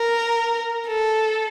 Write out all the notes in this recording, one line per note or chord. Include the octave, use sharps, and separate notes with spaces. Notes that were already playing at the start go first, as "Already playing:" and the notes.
Already playing: A#4
A4